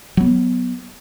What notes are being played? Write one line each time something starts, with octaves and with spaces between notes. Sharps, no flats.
F#3 B3